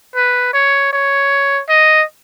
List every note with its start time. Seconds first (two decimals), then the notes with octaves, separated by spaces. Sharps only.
0.16 B4
0.54 C#5
0.93 C#5
1.69 D#5